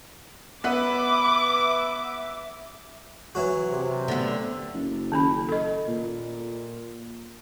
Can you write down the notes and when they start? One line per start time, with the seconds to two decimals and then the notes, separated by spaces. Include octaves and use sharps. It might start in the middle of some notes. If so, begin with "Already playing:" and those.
0.64 B3 B4 E5 D6
3.35 E3 F#3 F#4
3.70 C3
4.08 D3 B3
4.74 F#1
5.12 D#3 C#4 B5
5.49 A4 D#5
5.88 A#2